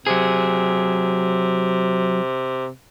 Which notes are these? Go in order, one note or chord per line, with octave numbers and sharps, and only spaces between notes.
C3 F#3 G#4